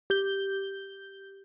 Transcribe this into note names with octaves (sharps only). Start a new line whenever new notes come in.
G4 G6 G7